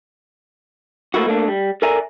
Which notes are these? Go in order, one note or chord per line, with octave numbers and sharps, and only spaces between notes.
A3 A#3 E4 F#4
A3 A#3 D4
G3
A4 A#4 D5 E5 G#5 A#5